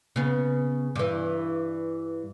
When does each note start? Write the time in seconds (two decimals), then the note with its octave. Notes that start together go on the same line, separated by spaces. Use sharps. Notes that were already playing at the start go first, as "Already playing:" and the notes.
0.16 C#3 B3
0.95 G2 E3